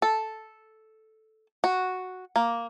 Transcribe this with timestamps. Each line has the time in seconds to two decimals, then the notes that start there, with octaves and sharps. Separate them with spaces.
0.02 A4
1.64 F#4
2.36 A#3